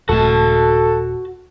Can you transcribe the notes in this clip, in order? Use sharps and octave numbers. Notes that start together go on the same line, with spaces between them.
D#1 A3 F#4 A4 A5